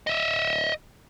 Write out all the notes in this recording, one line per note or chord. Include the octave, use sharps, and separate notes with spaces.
D#5 E5